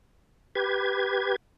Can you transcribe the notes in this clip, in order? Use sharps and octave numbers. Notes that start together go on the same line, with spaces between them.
G4 B4 G#6